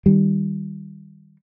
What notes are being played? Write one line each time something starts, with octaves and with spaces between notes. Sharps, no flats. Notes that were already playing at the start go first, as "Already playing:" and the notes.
D#3 G3